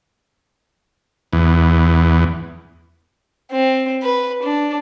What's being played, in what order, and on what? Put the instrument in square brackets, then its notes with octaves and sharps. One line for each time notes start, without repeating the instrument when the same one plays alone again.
[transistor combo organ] E2
[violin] C4
B4
D4